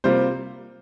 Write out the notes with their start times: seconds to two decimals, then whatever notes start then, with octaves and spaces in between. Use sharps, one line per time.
0.04 C3 G3 A#3 F4 C5